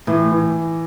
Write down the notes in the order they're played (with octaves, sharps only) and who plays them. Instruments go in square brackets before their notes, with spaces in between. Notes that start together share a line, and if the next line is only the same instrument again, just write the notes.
[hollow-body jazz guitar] A2 [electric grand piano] E3
[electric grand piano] E3